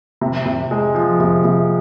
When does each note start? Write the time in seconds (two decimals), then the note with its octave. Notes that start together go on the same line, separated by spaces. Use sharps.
0.21 C3
0.46 C3
0.71 G#3
0.95 F3
1.20 C3
1.44 C3